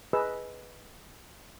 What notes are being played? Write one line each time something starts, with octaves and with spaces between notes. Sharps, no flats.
G#4 B4 D#5 E6